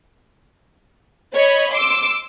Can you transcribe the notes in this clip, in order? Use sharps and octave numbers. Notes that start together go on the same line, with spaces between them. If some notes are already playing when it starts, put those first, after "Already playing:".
C#5 D#5 B5
C6 D6 E6